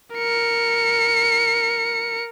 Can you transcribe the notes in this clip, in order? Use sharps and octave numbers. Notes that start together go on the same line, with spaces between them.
A#4 C#7